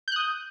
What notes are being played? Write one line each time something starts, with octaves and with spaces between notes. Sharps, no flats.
D#6 F#6 G6